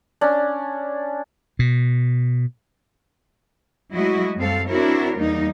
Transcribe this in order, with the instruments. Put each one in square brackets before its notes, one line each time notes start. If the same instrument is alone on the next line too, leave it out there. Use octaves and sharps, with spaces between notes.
[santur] C#4 D4
[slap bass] B2
[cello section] F#3 G#3 A3 E4 F#4 D#5
F#2 G3 C4 A4 F5
C4 D4 E4 F#4 A#4 C#5
E2 G3 A#3 D#4